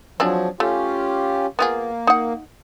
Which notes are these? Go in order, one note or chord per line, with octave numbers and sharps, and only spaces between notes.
F3 F#3 C4 D4 G#4
A3 C#4 F4 G4
A#3 B3 F4 G#4
D#4 F#5